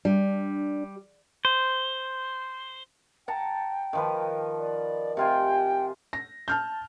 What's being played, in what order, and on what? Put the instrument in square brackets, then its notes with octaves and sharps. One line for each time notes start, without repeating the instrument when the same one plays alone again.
[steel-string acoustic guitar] G3 [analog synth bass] D4
[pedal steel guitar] C5
[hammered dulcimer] F#5 A5 A#5 [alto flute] G5
[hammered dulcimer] D#3 F3 B4
[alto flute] D5
[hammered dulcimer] C3 F4 G#5 [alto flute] G5
[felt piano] A#6
A5 F6 G6